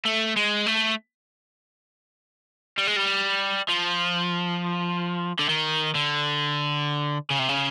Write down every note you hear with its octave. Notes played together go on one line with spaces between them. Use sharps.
A3
G#3
A3
G3
G#3
G3
F3
D3
D#3
D3
C#3
C3
C#3